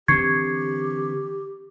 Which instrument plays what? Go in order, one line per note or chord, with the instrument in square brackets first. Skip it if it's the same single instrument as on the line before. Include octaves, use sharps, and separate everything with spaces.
[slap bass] D3 E3 C4 [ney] G4 [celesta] C#6 C7 C#7 [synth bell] G#6